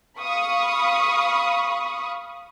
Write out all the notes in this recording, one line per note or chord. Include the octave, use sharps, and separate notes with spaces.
F5 B5 C#6 D#6